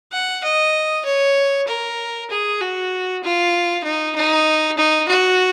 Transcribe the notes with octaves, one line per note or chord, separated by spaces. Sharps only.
F#5
D#5
C#5
A#4
G#4
F#4
F4
D#4
D#4
D#4
F#4